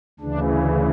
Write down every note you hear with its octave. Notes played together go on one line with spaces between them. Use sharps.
D2 C#3 E3 D4